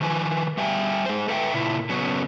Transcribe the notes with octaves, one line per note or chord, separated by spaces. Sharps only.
D#3 F3 B4 G#5
G3 E5 G5 G#5
G#3 C5
A4 B4 E5 F#5 G5
A#2 C#3 E4
C#3 F#3 B3 C#4